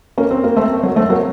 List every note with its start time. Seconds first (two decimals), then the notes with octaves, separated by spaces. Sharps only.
0.18 A#3 C#4
0.31 C4
0.44 A#3
0.56 A3 C4
0.83 F#3 A#3
0.96 A3 C4
1.10 F#3 A#3